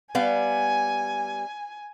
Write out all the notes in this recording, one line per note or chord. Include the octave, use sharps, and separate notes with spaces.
G3 B3 F5 G#5